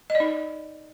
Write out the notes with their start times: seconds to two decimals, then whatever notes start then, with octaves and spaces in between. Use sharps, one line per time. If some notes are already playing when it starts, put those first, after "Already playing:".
0.10 D#5
0.15 D5
0.20 D#4